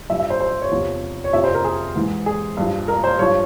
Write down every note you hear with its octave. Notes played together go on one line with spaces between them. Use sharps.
G2 F3 E5
E5
C5
C5
C#5
E2 C3 F3
C#5
F2 C3 F3 E5
C5
A#4
G#4
G#2 E3
G#4
G2 F3
A#4
C5
G2 F3 C#5